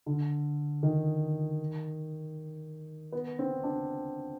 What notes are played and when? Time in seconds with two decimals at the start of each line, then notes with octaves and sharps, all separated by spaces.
0.06 D3
0.83 D#3
3.12 B3
3.39 C4
3.63 D4